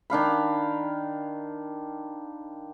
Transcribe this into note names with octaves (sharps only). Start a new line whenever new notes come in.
D#3 D4 F5 B5